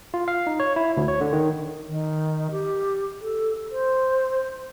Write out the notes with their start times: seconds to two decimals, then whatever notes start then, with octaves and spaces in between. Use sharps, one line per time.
0.14 F4
0.28 F5
0.47 D#4
0.60 C#5
0.76 E4
0.97 D2
1.08 C#5
1.21 D3
1.33 D#3
1.88 D#3
2.51 G4
3.21 A4
3.71 C5